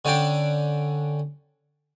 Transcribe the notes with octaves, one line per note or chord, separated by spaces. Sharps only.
D3 C#4 D4 G5 A5